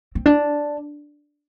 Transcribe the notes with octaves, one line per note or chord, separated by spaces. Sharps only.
C4
D4